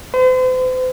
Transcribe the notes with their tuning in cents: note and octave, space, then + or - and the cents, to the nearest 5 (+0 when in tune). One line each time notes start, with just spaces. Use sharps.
C5 -40